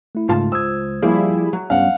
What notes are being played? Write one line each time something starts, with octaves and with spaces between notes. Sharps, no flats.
A3 E4
C#2 G#2 C#3 A3 F4 A5
C5 D#6 E6 G#6
F3 G3 A#3 E4 G#4
F#3
G2 B3 C#4 F5 F#5